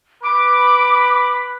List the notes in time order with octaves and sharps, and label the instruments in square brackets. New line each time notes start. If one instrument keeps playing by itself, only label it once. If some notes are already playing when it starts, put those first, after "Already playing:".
[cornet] B4 [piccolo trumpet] B5 [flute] D6